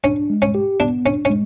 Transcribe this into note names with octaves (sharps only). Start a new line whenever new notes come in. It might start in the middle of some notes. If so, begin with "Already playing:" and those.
C#4 D4
G#3
C#4
G4
B3 D4
C#4 D4
C#4
G#3